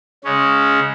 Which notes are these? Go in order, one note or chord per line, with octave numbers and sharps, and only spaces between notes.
C#3 G#3 C#4